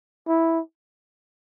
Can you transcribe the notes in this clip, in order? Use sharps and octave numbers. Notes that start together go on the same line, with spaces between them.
E4